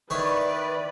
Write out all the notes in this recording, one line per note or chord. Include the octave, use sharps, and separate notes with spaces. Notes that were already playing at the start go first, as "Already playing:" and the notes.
D#3 E4 B4 C#5 D5